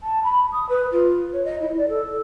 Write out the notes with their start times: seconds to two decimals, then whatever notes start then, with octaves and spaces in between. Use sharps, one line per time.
0.03 A5
0.24 B5
0.52 D#6
0.69 B4
0.92 F4
1.33 C#5
1.45 D#5
1.61 E4
1.77 D5
1.88 A4